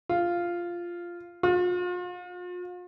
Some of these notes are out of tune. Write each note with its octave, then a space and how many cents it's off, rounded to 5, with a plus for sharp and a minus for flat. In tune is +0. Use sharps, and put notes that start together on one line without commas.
F4 -5
F4 +40